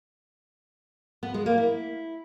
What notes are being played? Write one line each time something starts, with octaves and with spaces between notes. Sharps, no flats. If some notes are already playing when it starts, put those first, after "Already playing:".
B3
G#3
A#3
E4